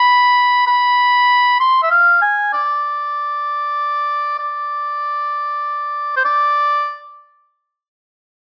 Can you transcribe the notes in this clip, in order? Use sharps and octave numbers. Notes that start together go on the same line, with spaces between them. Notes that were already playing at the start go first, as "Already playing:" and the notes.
Already playing: B5
B5
C6
E5
F5
G#5
D5
D5
C5
D5